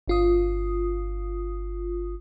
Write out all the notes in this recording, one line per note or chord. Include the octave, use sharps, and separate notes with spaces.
G1 F4 D#6